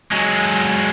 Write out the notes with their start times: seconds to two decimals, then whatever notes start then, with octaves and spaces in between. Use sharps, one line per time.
0.12 F#3 G#3